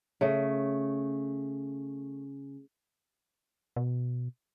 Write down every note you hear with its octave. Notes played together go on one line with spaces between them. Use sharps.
C#3 A3
B2